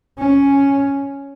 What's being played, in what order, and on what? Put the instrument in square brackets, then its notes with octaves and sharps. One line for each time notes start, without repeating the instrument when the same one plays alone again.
[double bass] C#4